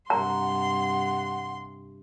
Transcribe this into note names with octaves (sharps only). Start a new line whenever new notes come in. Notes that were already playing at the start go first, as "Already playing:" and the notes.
G2 C3 F#5 A#5 C6